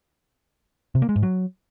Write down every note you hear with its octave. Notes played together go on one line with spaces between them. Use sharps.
C3
A#3
G#3
G#2
F#3